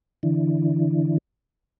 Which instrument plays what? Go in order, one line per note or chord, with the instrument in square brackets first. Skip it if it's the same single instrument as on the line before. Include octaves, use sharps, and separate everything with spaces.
[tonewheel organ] D3 E3